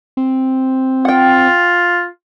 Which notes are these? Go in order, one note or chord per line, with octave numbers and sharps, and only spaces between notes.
C4
F4 F#5 G5